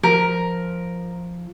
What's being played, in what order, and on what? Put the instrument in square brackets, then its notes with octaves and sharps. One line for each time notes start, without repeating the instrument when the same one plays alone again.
[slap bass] F3 [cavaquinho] A#4